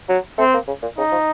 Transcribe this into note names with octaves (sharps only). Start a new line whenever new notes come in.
F#3
A3 C4
A#3
C#3
A#2
C#3 D#4
F3